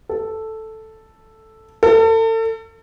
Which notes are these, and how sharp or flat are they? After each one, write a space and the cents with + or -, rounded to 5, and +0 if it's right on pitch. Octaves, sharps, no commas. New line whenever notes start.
A4 +0
A4 +35